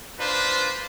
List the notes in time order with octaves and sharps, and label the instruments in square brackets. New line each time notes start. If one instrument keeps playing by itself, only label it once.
[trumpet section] D4 F4 B4 C5